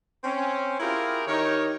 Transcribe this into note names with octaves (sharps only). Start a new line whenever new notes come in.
C4 C#4
E4 F4 G4 G#4 A#4
D#3 D#4 G4 A#4 C#5